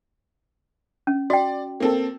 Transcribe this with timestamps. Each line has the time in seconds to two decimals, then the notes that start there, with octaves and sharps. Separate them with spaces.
1.07 C#4
1.30 F#4 D5 G5
1.80 A#3 C4 A4